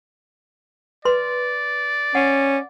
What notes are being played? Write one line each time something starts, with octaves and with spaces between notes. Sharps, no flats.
B4 D5 C6
C#4 F#5